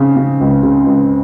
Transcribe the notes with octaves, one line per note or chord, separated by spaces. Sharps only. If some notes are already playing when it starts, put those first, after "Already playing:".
Already playing: C#3 C4
C#3
C#2
C#3
C#2